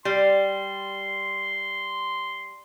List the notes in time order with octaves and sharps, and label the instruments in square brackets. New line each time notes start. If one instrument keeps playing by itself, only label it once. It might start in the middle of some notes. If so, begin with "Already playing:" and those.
[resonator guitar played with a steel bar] G3 [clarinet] C6